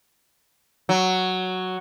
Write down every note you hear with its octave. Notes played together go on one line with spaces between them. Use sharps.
F#3